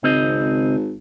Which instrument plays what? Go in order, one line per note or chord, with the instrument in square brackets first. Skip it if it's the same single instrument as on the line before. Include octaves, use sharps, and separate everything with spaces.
[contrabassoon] G#1 [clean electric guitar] C#2 C4 D#5